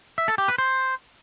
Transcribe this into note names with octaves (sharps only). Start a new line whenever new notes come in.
E5
A4
G4
B4
C5